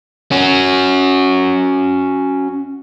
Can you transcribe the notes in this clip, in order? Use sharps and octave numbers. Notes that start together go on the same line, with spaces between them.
C#4 F#4